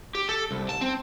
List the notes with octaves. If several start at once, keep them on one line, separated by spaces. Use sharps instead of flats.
G4
A4
C2
A5
C4